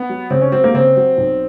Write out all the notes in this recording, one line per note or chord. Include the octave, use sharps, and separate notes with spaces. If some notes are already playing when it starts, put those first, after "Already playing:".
Already playing: B3
F#3
C#3 C4
C#4
F#3 C4
A#3
C#3 C4
F#3
B1